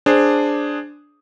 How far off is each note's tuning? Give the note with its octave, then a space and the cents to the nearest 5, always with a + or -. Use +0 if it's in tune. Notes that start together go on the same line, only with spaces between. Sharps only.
D4 +0 G#4 +0 C5 +0